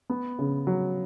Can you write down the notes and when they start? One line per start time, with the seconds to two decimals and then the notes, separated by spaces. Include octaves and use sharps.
0.10 B3
0.39 C#3
0.67 F#3